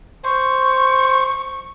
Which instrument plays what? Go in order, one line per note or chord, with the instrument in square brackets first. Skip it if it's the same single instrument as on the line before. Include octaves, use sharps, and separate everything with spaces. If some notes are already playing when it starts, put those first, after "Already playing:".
[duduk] C5 [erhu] C#6